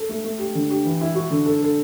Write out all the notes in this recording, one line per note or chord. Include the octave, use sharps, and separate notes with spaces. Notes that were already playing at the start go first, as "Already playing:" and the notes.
Already playing: A4
A3
A3
G4
D3
G4
E3
E4
F#4
D3
A4
A4